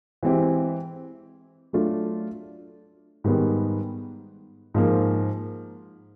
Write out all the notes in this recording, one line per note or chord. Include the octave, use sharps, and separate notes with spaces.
E3 G#3 C4 E4 G4
F#3 A3 D4 F4
G#2 D#3 G3 B3
G#2 F3 A#3